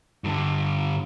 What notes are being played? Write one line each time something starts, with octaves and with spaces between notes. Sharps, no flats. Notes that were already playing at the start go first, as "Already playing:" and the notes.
G2 D3